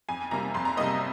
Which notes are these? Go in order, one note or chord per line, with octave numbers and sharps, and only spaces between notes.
F2 G#5
C3 G3 A#3 A#5
F2 C6
A#5
C3 G3 A#3 D#5